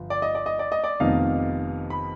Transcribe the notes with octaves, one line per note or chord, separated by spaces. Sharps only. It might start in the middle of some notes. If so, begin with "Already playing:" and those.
Already playing: G1 F3
D5
D#5
D5
D#5
D5
D#5
D5
F1 F2 D#3 B3 D#4 F5
B5